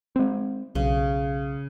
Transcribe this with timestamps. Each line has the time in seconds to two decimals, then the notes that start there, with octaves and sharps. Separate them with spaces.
0.16 G#3 C4
0.75 B1 C#3